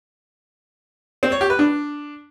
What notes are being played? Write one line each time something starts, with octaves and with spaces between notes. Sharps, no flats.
C4
C#5
G4
B4
D4